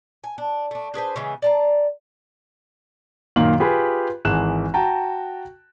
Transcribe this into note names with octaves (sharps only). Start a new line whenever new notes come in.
G#5
D4
A3 D4
D4 G#4 B4 C5
C#3 E3 G#3 B3
D5 A5 A#5
F#2 A#2 D#3 F5 F#7
F4 G4 G#4 B4
G#1 E3 G#4 F#6 E7
F#4 G5 A5 A#5